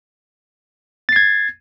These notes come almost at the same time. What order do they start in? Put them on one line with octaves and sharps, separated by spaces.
A6 C7 G#6